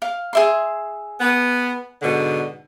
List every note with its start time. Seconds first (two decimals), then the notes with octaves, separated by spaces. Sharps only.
0.02 F5
0.33 G#4 E5 C6
1.20 B3
2.02 G#2 B2 D3